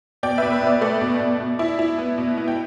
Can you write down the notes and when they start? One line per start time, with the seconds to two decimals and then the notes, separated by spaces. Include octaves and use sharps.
0.23 B2 D5 G5
0.38 B2 B4 E5
0.52 B4
0.62 B2 D5
0.81 A3 D5
1.01 B2
1.20 B2
1.40 B2
1.59 E4
1.79 E4
1.98 B3
2.18 B2
2.37 B3
2.48 G5